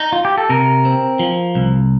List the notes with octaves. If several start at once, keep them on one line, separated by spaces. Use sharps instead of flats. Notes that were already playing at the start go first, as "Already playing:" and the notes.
D#4
F4
G4
A4
C3 A#4
C4
F3
C2